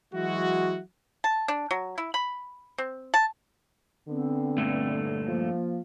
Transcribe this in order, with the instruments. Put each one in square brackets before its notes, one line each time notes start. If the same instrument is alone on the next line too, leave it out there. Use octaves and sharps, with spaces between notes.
[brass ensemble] E3 F#3 G#3 E4 F#4
[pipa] A5
D4
F#3
E4
B5
C4
A5
[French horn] D3 [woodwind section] B3 C4
[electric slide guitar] G2 A#2 A3
[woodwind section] F3 A#3